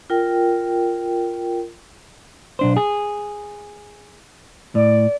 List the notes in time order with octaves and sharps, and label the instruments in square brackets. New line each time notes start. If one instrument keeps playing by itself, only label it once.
[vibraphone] F4 A#4 G5
[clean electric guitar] B1 D4 C5
G#4
[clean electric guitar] A2 [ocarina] D5